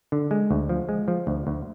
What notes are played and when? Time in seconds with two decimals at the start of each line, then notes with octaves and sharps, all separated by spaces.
0.12 D3
0.31 G#3
0.51 D2
0.69 F3
0.89 G#3
1.08 F3
1.27 D2
1.47 D2